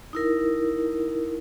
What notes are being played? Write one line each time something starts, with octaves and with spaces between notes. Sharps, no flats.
D#4 E4 A#4